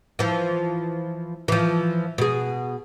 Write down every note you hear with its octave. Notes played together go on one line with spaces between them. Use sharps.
E3 F3
E3 F3
B2 G#4